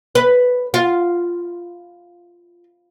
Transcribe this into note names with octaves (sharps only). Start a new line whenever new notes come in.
B4
F4